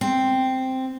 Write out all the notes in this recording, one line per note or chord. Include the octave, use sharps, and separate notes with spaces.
C4